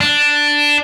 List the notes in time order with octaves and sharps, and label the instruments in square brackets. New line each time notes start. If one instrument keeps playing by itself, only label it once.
[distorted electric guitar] D4